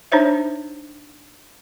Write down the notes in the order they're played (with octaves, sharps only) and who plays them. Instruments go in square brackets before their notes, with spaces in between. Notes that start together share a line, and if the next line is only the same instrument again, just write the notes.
[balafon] D4 D#4 C5 C#5 E5